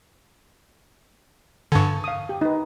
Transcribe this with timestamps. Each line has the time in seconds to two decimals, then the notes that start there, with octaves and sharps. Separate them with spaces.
1.72 G2 D3 G#5 A5 C#6
2.04 F5 D#6
2.29 G4
2.41 D#4 B4